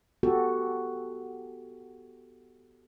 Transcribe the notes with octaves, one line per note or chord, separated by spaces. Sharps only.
B3 F#4 G4 A4